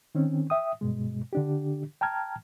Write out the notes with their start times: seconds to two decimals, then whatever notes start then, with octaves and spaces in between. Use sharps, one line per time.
0.15 D#3 C4 C#4
0.50 E5 G5 D#6
0.81 G2 B2 G#3
1.33 D3 D4 G4
2.01 G5 A5 A#5 F6 G#6